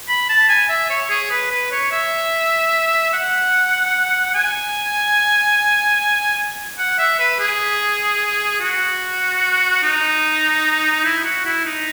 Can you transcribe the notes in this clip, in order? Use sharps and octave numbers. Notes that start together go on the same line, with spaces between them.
B5
A5
G#5
E5
C#5
G#4
B4
B4
C#5
E5
F#5
G#5
F#5
E5
B4
G#4
F#4
D#4
E4
F#4
E4
D#4